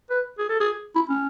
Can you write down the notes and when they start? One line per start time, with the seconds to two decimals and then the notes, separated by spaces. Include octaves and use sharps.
0.10 B4
0.39 G#4
0.49 A4
0.60 G#4
0.96 E4
1.09 C#4